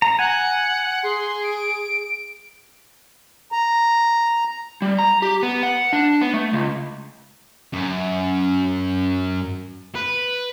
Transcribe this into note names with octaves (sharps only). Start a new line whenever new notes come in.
A#5
F#5 G#5
G#4 C6
D7
A#5
G3
A#5
G4
B3
F#5
D4
B3
A3
C#2
F#2
B4